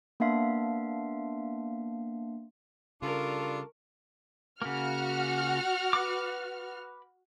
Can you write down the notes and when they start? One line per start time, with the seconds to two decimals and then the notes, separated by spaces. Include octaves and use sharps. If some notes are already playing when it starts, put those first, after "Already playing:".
0.20 A#3 B3 D4 E5 F5 C6
3.02 C#3 G3 D4 F4 A4 A#4 C#6
4.62 C#3 A#3 F#4 F6
5.93 B4 D6